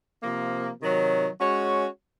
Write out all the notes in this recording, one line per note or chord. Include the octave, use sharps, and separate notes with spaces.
C3 F3 A#3
C3 D#3 F#3
G#3 C#4 F#4 C#5